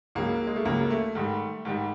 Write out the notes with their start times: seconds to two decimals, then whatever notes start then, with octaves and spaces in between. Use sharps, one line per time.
0.15 C#2 C#3 F#3 A#3
0.47 G#3
0.56 A3
0.65 C#2 C#3 F#3 A#3
0.90 A3
1.15 G#2 D#3 G3
1.65 G#2 D#3 G3